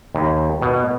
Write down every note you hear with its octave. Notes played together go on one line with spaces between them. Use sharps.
D#2
B2